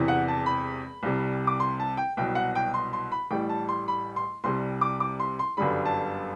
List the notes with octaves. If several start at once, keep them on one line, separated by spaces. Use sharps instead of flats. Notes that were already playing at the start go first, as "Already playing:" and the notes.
Already playing: E1 E2 C3 E3
F#5
A5
B5
C2 C3 G3
D6
C6
A5
G5
C2 B2 F#3 G5
F#5
G5
C6
C6
B5
A1 A2 G3 G5
A5
C6
B5
C6
C2 C3 G3 C6
D6
D6
C6
C6
G1 F#2 D3 G3 B5
A5